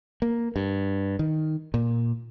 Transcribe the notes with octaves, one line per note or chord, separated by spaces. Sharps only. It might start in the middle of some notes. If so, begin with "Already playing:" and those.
A#3
G2
D#3
A#2